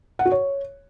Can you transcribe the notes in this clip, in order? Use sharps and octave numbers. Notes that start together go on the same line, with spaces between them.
F#5
F#4
C#5